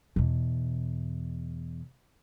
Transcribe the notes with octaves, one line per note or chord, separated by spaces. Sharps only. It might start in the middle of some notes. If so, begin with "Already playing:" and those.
E2 B2